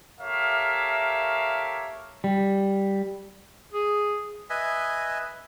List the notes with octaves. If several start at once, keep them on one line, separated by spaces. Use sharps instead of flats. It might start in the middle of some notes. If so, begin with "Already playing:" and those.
G4 A4 A#4 C#5 E5 F5
G3
G#4
B4 D#5 E5 G#5